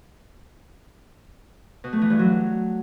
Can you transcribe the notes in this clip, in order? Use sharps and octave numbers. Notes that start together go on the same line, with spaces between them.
B2
A3
E3
G2
F#3